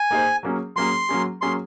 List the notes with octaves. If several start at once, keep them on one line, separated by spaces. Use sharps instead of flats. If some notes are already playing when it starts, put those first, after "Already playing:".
Already playing: G#5
A#3 D#4 G#4 C5
F#3 A#3 C#4 G#4
F#3 A#3 C#4 G#4 C6
F#3 A#3 C#4 G#4
F#3 A#3 C#4 G#4 C6